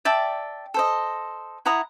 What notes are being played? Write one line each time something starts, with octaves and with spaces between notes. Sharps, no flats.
D5 E5 G5 A5
A4 C5 D#5
E4 F#5 A#5 D#6